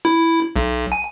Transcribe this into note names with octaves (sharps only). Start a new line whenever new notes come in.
E4
B1
G#5